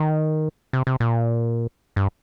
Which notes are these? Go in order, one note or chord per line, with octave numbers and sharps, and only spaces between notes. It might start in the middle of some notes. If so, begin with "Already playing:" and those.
Already playing: D#3
C3
C3
A#2
G2